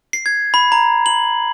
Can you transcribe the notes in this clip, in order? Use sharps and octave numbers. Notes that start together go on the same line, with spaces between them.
C7
G#6
B5
A#5
F#7